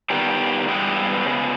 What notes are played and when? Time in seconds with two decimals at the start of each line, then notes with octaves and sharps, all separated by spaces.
0.10 D#3 G3 B3 G4
0.68 G2 E3 G#3 B3 G4
1.25 C#3 G#3 B3